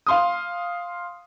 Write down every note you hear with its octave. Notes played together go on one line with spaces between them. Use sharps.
F5 C6 D#6